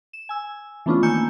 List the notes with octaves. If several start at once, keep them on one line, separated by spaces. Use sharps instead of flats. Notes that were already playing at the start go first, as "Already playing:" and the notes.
E7
G#5 E6
E3 A3 B3 C#4 D4 F4
D#3 A#3 G#5 E6 G6 C#7